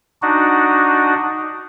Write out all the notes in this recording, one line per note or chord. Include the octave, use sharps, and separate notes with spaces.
D4 D#4 F#4